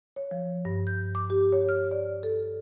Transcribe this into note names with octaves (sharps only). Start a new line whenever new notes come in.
C#5
F3
G2
G6
D6
G4
C#5
F6
D5
A4